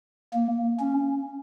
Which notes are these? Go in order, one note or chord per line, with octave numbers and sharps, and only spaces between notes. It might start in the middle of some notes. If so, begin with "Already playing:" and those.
A#3
C#4